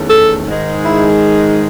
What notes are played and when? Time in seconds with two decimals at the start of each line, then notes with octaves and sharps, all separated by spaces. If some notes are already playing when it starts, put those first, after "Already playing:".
Already playing: E2 D#3 A3 C#4
0.09 A4
0.47 G#2 D#3 G#3
0.85 E4